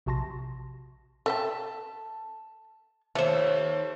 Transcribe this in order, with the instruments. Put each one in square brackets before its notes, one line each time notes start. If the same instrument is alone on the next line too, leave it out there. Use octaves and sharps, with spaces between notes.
[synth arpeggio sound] A#1 C3 F#4 A5 C6 A#6
[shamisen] A4 E5 G5 [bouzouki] A5
[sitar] D#2 [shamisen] F3 [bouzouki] A3 C5